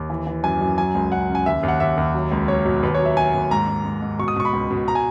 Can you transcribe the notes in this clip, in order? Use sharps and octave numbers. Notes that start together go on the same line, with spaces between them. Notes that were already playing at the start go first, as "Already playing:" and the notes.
Already playing: D#2
E3
E3
F#2 G#5
F#2
F#3 G#5
C#2
C#2 F#5
C#3
G#5
D#2 E5
D#2
F#5
D#2 E5
D#2
F#3
C#2
F#3 C#5
B2
D#2 B4
C#5
F#3
E5
F#3 G#5
D#2
G#2 A#5
G#2
G#2
G#2
B2 C#6
D#6
B2 C#6
B5
C#2
B2
A#5
G#5